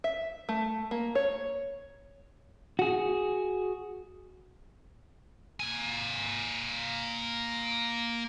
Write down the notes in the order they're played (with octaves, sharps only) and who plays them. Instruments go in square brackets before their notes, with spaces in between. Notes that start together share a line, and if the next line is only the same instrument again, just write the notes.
[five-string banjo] E5
A3
A#3
C#5
[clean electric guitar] F#4 G#4
[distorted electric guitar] A#3 G#5